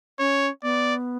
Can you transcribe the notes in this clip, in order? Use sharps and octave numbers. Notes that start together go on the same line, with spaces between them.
C#4 C#5
B3 D5